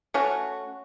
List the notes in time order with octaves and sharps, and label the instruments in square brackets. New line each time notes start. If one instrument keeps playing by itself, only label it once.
[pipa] A3 C#4 F#4